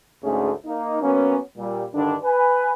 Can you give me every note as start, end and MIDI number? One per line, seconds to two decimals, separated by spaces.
0.24 0.51 38
0.24 0.51 44
0.24 0.51 57
0.24 0.51 61
0.24 0.51 68
0.66 1.01 58
0.66 1.01 63
1.02 1.37 54
1.02 1.37 58
1.02 1.37 59
1.02 1.37 61
1.58 1.85 46
1.58 1.85 55
1.94 2.16 43
1.94 2.16 50
1.94 2.16 51
1.94 2.16 62
2.24 2.73 71
2.24 2.73 80